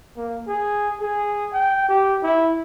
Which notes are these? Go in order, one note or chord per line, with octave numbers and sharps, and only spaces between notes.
A#3
G#4
G#4
G5
G4
E4